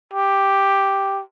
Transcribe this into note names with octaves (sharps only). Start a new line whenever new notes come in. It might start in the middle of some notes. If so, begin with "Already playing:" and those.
G4